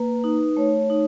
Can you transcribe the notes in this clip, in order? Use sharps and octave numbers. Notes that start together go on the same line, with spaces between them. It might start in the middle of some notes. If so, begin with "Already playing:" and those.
Already playing: A#3 B4
D#4
A3 C#5
D#4